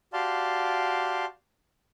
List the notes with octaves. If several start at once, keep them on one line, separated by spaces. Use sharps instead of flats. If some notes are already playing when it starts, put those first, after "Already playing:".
F#4 G4 D5 F5 A5 C6